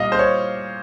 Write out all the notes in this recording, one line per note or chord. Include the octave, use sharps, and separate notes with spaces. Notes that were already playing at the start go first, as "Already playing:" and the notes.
Already playing: A#2 G3 D#5 F5
C5
C#5